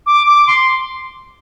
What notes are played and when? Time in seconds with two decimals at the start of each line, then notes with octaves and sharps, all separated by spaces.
0.06 D6
0.27 D6
0.47 C6